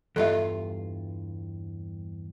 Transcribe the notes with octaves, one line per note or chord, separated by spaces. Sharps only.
E2 G2 F4 A4 D#5 E5